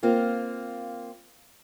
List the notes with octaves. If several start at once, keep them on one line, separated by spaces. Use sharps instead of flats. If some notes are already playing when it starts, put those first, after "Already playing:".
A#3 C4 F4